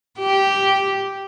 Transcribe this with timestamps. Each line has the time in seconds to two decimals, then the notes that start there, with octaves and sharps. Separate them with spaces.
0.19 G4